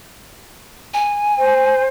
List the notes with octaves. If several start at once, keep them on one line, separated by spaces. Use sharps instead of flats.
G#5
C5